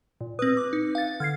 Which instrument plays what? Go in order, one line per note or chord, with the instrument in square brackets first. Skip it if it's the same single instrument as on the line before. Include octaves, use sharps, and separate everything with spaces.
[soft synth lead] A#2
[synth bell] C4 D#6 [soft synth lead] B4
[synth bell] D6
D#4
F5 A6
[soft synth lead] D3 [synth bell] F6 G#6 C7